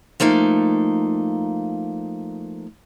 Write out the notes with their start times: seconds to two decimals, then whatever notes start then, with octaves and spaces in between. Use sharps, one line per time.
0.20 F3 A3 A#3 D#4